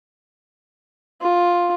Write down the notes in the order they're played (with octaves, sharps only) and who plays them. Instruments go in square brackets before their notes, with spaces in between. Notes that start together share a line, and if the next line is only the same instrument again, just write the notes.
[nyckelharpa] F4